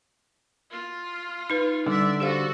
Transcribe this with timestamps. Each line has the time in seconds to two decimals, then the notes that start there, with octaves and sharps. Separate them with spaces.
0.71 F4
1.50 D#4 B4
1.87 D3 G3 D5 E5
2.20 F#4 G4 A4 C5 F5